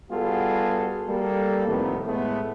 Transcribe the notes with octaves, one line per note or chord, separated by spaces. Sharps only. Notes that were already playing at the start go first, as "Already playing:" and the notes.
G3 B3 F4 F#4 G#4 A4
G3 A#3 A4
C2 F2 A2 D#3 B3
A2 G#3 A3 B3